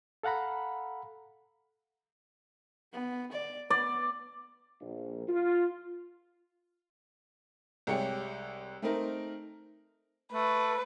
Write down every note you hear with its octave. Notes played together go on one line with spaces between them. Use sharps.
A4 F5 F#5 A#5 B5
B3
D5
B3 D5
A#1
F4
C2 G#3 G4 C#5 C#7
A3 C4 D#4 A#4
A3 B4